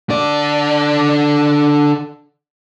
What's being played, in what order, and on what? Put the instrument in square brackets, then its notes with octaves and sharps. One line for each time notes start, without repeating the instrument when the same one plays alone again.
[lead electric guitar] D3 D5